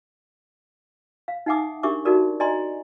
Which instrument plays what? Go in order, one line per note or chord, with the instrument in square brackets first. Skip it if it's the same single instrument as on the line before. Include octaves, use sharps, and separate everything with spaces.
[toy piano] F5
D#4 E5 F#5 G#5 D6 D#6
D4 G4 A#4 E5 C#6 D6
D#4 F#4 A4 A#4 D5
D5 D#5 G#5 A#5 C6